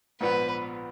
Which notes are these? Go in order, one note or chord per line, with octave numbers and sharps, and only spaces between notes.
A#1 G#2 F3 B3 B4